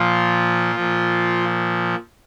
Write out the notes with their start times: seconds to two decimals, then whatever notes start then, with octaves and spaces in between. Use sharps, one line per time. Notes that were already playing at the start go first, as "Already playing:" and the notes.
Already playing: A#2 F3 F4
0.75 A#2 F3